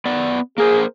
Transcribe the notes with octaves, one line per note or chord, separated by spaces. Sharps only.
B3 D5
A#3 G#4 A#4 C5